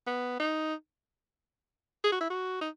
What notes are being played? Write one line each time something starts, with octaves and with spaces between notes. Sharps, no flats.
B3
D#4
G#4
F#4
E4
F#4
D#4